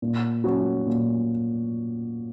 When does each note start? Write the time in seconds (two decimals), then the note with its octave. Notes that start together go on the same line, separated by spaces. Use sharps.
0.02 A#2
0.44 F#3 C#4 F#4
0.87 A#2